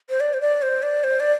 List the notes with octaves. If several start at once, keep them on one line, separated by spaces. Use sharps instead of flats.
C5
D5
C5
D5
C5
D5
C5
D5